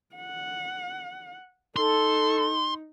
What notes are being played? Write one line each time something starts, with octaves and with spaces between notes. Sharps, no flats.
F#5
D#4 A4 C6